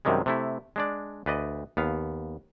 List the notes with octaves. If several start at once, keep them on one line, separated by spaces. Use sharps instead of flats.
F#2 C3 D#3 G3 G#3
C3 A3 E4
G#3 D4 D5
D2 B4 D5 D#5
D#2 B3 F5